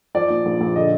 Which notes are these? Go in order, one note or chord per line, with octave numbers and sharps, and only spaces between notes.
F3 D5
A#2
A#1
A#1
D3 D#5